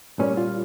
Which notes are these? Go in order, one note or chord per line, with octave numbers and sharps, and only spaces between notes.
A#2 G3 A#3 C#4
F4